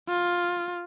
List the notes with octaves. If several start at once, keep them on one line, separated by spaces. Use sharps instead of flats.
F4